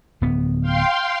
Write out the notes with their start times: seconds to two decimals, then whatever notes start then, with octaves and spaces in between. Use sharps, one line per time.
0.21 D1 B3
0.62 F5 G5 C6